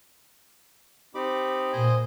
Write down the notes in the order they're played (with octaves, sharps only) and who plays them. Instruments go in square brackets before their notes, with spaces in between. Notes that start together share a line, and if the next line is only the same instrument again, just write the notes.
[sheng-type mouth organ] C4 D#4 [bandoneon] G4 B5 D6
[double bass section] A#2 [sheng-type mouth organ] C5 D#5 G#5